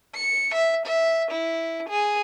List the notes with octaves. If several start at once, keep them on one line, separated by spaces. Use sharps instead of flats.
C#7
E5
E5
E4
G#4